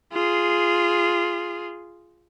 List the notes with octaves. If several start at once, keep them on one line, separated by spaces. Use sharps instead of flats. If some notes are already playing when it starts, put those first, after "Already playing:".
F4 G#4